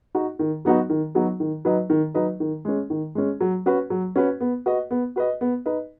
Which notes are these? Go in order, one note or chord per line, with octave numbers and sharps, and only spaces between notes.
D#4 F#4
D#3
F#3 B3 D#4 F#4
D#3
F#3 B3 D#4 F#4
D#3
F#3 D#4 B4 D#5
D#3
F#3 D#4 B4 D#5
D#3
G#3 C#4
D#3
G#3 C#4
F#3
C#4 F#4 B4
F#3
C#4 F#4 B4
B3
F#4 B4 D#5
B3
F#4 B4 D#5
B3
D#4 B4 D#5